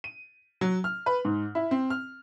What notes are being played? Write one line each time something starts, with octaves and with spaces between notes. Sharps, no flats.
D#7
F#3
F6
B4
G#2
E4
C4
F6